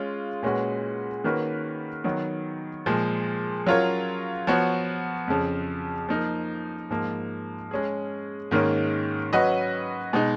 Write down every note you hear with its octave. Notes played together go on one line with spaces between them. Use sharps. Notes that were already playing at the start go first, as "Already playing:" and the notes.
Already playing: G#3 C#4 F4
A#2 G#3 C#4 F#4 B4
D#3 A#3 C#4 F#4 B4
D#3 F#3 B3
A#2 F3 G#3
F#3 C#4 F4 A#4 C#5
F3 B3 F#4 C#5
F2 C#3 F3
F3 A#3 D#4 A#4
G#2 F3 A#3
G#3 C#4 G#4
G#2 D#3 A#3 C#4
F#3 C#4 F#4 B4 D#5
B2 G#3 D#4